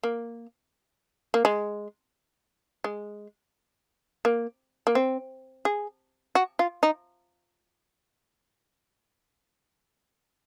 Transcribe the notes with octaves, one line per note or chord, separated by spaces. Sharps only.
A#3
A#3
G#3
G#3
A#3
A#3
C4
G#4
F#4
F4
D#4